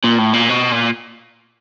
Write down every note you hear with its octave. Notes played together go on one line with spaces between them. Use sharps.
A#2
A2
A#2
B2
A#2